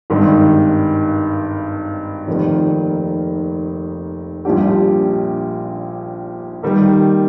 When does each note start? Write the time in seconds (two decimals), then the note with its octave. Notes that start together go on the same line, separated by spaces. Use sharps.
0.10 G#1 G2 D#3 G#3
2.28 F1 F2 D#3 A#3
4.45 A#1 A#2 G3 D4 G4
6.63 D#3 G3 A#3